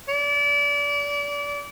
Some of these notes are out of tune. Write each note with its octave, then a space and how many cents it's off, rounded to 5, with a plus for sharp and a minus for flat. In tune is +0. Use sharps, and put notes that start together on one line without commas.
D5 -30